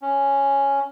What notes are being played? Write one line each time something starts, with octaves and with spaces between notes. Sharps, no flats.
C#4